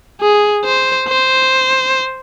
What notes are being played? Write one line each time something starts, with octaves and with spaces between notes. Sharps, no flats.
G#4
C5
C5